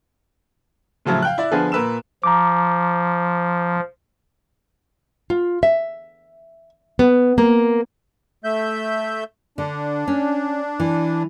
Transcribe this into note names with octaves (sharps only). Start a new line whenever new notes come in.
A2 C#3 F3 F#3 C#4 E4
F5 G5 F#6
E4 D5
D3 F3 B3 D4 G#4 B4
A#2 A#4 B4 E6 E7
F3 A#5 D6
F4
E5
B3
A#3
A3 E5 G6
D3 D4
C#4
E3